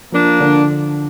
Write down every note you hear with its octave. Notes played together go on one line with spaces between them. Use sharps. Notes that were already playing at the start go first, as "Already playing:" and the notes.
F3 A#3 D4
D3